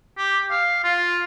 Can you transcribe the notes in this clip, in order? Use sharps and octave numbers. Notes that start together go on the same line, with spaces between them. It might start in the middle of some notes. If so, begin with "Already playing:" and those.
G4
F5
F4